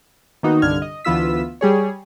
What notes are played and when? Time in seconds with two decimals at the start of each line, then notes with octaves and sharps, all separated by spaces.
0.43 D#3 A#3 B3 D#4 F#4
0.62 C2 G2 D3 F6 G#6
0.82 D#5
1.05 D2 E3 B3 F4 E6 B6
1.61 G3 G#4 C#5